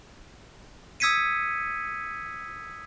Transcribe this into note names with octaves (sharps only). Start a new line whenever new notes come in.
D#6 E6 G#6 B6 C#7 D#7